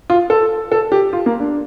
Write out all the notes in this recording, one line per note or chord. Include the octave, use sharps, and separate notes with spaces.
F4
A4
A4
G4
F4
A#3
D4